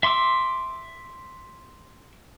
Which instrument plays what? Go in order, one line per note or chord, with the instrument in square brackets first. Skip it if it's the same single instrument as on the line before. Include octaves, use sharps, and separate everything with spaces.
[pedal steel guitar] E5 C6 D6 E6